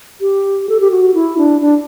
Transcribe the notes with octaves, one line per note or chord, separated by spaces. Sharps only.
G4
A4
G4
F#4
E4
D4
D4